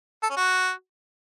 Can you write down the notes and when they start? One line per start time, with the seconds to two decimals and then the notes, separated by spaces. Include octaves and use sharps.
0.23 A4
0.30 C#4
0.37 F#4